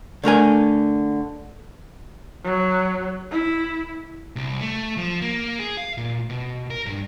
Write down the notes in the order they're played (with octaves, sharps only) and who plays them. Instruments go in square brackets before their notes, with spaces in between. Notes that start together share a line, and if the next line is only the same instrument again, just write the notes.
[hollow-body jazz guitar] D3 A3 A#4 G#5
[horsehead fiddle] F#3
E4
[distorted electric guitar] C2
A3
F3
A#3
G#4
F5
A#2
B2
A#4
G2